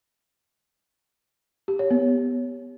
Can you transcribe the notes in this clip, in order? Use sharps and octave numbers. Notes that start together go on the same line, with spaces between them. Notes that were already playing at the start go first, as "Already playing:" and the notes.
G4
C#5
B3